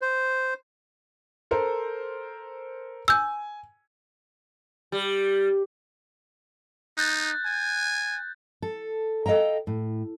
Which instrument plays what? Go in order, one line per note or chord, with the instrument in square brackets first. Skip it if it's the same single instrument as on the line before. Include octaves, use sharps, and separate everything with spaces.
[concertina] C5
[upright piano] A4 A#4 C5
[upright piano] G#5 [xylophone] E6 G6
[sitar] G3
[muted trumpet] D#4 [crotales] F#6 G6 A6
[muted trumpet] G#5
[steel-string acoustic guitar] A4
A4 D#5 F5 G5 A#5
A2